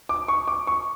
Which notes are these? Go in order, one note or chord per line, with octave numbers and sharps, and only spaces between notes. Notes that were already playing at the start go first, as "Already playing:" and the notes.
D6
C#6
D6
C#6